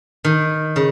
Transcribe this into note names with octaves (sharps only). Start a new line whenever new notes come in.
D#3
C#3